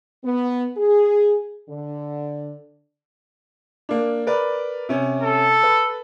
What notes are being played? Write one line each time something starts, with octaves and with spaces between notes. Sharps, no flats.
B3
G#4
D3
A#3 D4
A#4 B4 D5
C3 C#4
A4
B4